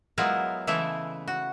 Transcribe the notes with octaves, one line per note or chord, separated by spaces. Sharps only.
F#3 G#3 B3 E4 F4 A#4
C#3 E3 G#3 A3 E4 E5
F#4